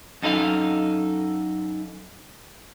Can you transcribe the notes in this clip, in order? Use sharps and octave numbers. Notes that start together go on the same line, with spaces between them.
F#2 D#4 A4 A#4 F5